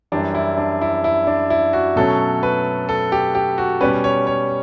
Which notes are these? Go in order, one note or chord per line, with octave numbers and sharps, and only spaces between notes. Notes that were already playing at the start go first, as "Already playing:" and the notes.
F#2 E3 G3 D4
E4
D4
E4
E4
D4
E4
F#4
B2 F#3 A3 C#4 A4
B4
A4
G4
G4
F#4
B2 G3 C#4 B4
C#5
C#5